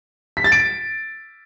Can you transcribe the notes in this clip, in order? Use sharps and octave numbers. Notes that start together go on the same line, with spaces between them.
B6
A6
D7